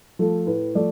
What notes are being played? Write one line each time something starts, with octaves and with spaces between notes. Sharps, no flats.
F3 A3 A4
A2 B4
F3 A3 D5